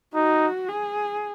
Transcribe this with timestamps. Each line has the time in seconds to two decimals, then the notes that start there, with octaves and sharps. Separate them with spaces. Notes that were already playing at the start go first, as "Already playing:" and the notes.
0.15 D#4 F#4
0.69 G#4